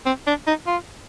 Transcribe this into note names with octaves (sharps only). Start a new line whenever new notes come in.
C4
D4
D#4
F4